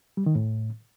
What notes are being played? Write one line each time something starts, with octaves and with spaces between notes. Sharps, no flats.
G3
D#3
A2